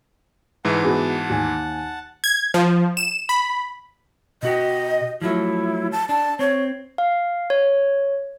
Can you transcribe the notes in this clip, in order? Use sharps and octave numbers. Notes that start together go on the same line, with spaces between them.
G#2 E3 F#5 A5
B3 F#4 G#4
D#2 G#5
G#6
F3
E7
B5
B2 F#4 G4 D#5
F3 F#3 A3 E4
A5
D4 A5
C4 C#5
F5
C#5